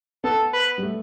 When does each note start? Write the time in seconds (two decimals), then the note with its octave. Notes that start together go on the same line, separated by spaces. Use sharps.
0.24 B3 A4
0.53 B4
0.78 G3
0.83 A3